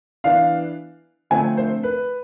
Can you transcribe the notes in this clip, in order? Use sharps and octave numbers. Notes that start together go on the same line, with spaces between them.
E3 B3 D4 F5
D3 F3 A3 C4 G#5
C5
B4